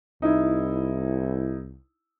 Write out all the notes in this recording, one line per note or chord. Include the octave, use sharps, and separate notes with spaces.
C2 D#4 E4